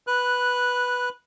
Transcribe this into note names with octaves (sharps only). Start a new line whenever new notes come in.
B4 F#6